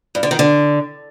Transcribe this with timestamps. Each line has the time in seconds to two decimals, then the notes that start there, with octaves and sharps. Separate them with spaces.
0.15 G2
0.23 D3
0.31 D#3
0.39 D3